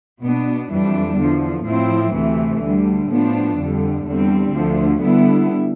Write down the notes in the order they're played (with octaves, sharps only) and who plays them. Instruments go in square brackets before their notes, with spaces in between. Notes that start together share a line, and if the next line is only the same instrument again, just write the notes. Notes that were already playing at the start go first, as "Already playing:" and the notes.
[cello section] B2 B3 D4
F2 E3 G3 D4
E2 D3 F3
A2 F3 C4 E4
D2 C3 E3 A3
D2 D3 G3
A2 F3 B3 D4
F2 D3 G3
E2 D3 G3 C4
D2 D3 F3
D3 G3 B3 E4